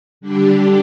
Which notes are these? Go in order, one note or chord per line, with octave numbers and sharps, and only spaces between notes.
D3 G3 D4 G4